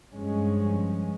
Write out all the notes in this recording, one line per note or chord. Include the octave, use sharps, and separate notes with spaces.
G2 F3 G#3 C#4